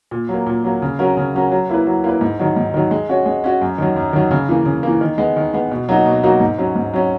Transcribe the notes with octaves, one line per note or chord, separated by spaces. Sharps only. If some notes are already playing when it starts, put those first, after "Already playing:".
A#2
F#3
A#3
A#2
F#3 A#3
C#3
F#3 C#4 F#4 A#4
C#3
F#3 C#4 F#4 A#4
F#3
A#3 E4 B4
F#3
A#3 E4 B4
G#2
D#3 F#3
G#2
D#3 F#3
G#3
C#4 F#4 C#5
G#3
C#4 F#4 C#5
F#2
D#3 F#3
F#2
D#3 F#3
C#3
E3 A#3
C#3
E3 A#3
D#3
G#3 B3
D#3
G#3 B3
B2
F#3 A#3 D#4 F#4
B2
F#3 A#3 D#4 F#4
G#2
F#3 C#4
G#2
F#3 C#4